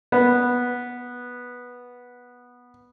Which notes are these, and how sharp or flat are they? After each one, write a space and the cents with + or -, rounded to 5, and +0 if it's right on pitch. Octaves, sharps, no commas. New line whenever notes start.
B3 -10